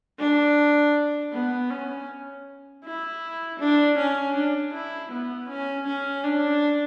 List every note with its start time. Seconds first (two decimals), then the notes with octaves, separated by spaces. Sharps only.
0.19 D4
1.33 B3
1.71 C#4
2.85 E4
3.60 D4
3.98 C#4
4.35 D4
4.74 E4
5.11 B3
5.49 C#4
5.87 C#4
6.24 D4